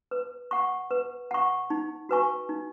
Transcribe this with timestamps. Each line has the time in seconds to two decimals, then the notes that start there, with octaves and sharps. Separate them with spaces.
0.11 B4
0.51 F#5 C#6
0.91 B4
1.31 F#5 C#6
1.70 D#4
2.09 F#4 B4 G#5 C#6
2.49 D#4